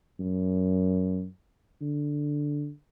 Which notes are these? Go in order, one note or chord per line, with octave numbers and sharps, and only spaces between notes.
F#2
D3